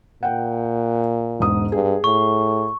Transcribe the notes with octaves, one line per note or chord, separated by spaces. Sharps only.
A#2 F#5 G5
E1 G#2 D#6
G2 G#4
A2 C#6